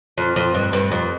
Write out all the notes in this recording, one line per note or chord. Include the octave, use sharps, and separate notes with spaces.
F2
F2
G2
G2
F2